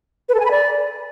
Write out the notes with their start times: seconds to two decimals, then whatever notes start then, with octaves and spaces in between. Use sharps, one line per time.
0.29 B4
0.34 A4
0.40 G#5
0.45 B5
0.51 D5